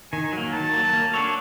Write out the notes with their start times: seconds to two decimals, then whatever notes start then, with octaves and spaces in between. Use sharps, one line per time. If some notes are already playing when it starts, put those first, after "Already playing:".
0.12 D#3 G#5
0.33 F#3 A#3
0.53 D#3 A5
0.74 F#3 A#3
0.93 A#3
1.14 D4 F#4 A4 C#5